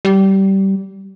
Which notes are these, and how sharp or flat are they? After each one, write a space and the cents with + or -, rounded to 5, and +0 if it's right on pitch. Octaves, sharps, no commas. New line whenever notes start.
G3 -20